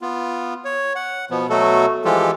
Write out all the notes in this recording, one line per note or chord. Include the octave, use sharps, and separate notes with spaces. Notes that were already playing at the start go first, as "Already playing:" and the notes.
B3 F4
C#5
F#5
B2 F3 B3
B2 F#3 A3 F#4 A4
E3 F3 G#3 F4 G4 A4